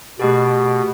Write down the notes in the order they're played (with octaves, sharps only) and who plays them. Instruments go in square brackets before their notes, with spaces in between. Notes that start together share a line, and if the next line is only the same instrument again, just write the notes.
[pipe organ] B2 [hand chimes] A3 G4 G#4